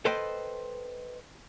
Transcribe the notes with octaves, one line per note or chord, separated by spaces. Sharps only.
A4 B4 C5 D#5 G5